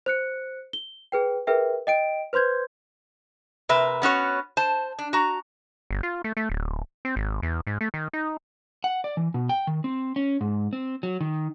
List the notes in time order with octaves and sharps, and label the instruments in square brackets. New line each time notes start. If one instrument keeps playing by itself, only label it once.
[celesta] C5 F#6 C#7
G7
G#4 B4 G5
G#4 A#4 B4 E5 G5
D#5 G5 D7
B4 C5 C6 G6 G#6
[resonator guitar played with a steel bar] C3 A#4 B4 E5
B3 C#4 F#4 C#5
C5 A5
D4
F#4 A#5
[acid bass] G1
F4
A3
A3
D1
C4
G#1
E2
G#2
A3
D#3
D#4
[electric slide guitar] F#5
D5
E3
B2
G5
D#3
C4
C#4
G#2
C4
F#3
D#3